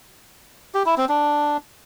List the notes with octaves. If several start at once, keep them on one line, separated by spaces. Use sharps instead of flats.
G4
E4
C4
D4